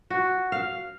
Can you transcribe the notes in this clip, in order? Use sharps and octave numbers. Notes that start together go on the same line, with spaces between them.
F#4
F5